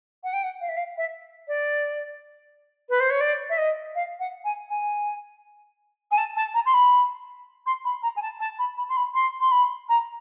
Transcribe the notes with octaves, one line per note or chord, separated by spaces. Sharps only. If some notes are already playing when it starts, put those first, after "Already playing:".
F#5
G5
F#5
F5
E5
F5
E5
D5
B4
C5
C#5
D5
E5
D#5
F5
F#5
G#5
G#5
G#5
A5
A5
A#5
C6
B5
C6
B5
A#5
G#5
A5
A5
B5
B5
C6
B5
C6
C6
B5
A#5